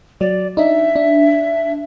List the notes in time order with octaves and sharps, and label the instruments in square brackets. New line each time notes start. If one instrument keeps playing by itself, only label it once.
[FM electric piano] F#3 [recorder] D5
[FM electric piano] D4 D#4 [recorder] E5
[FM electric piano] D4